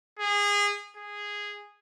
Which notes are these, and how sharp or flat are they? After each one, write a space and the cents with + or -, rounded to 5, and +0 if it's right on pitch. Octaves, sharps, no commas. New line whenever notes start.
G#4 -25
G#4 -10